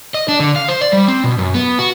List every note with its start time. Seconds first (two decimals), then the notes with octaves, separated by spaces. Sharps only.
0.14 D#5
0.28 D4
0.40 D3
0.56 F5
0.68 C5
0.81 D5
0.93 G3
1.08 C4
1.24 B2
1.38 F#2
1.55 B3
1.79 F#4